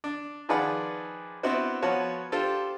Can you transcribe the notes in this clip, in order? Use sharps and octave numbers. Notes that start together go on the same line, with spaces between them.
D4
D#3 F3 G#4 B4 D5 F#5
B3 C4 D4 E4 F#4 C5
F3 B3 F#4 C#5
D4 F4 G4 A4 C5